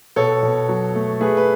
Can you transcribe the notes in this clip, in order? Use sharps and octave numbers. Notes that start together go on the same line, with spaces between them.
B2 A4 C#5
B2
F#3
A3
A3 G#4 B4
B4